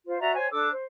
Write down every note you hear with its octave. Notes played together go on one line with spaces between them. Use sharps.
F4 C5
F#4 D5 E5 A#5
C5 C#5 G#5
D4 A4 D6 E6
C5